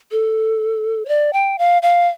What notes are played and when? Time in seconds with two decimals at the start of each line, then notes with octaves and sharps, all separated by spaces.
0.11 A4
1.05 C#5
1.08 D5
1.33 G5
1.58 F5
1.82 F5